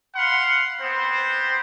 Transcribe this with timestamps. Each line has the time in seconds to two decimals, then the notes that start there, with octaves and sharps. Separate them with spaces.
0.15 F5 F#5 B5 C6
0.81 B3 C4 C5